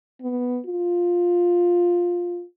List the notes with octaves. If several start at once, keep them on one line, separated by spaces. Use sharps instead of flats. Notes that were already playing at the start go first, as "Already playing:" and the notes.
B3
F4